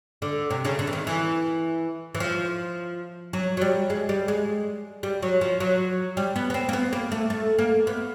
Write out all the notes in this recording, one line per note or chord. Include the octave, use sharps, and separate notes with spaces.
D3
C3
C#3
D3
E3
D#3
E3
E3
F3
F#3
F#3
G3
G#3
G3
G#3
G3
F#3
F3
F#3
G3
B3
B3
C4
A#3
B3
A#3
A3
A3
A#3
B3